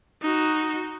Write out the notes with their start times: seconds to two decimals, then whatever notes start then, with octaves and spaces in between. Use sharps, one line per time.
0.22 D#4 F#4